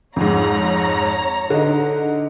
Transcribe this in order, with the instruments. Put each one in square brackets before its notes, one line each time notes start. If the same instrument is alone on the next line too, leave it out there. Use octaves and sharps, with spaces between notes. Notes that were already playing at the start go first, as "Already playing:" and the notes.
[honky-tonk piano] F2 G#2 [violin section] C#5 A#5
[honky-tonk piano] D3 D#4